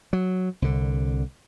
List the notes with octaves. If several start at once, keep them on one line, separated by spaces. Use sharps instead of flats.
F#3
C2 D3